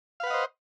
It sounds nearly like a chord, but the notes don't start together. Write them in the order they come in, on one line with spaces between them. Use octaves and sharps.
F5 B4 F#5 D#5 C5